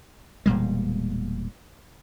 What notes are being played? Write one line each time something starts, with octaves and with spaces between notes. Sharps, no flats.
E1 A#2 G3 G#3